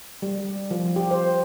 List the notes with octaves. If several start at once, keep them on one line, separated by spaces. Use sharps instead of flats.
G3
F3
G4
C5